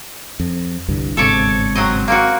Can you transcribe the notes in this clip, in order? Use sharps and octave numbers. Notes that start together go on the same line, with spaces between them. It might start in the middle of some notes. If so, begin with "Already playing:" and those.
F2
C2 G2 D3
G1 G#2 C3 A4 C#5 D5
F#3 C4 D#5
A#3 C4 F#4